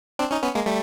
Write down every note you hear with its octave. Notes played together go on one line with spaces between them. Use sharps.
C4 D4
C#4 D#4
B3 C#4
G#3 A#3
G3 A3